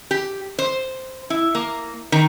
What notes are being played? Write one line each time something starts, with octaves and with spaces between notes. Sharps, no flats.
G4
C5
E4
A#3
D#3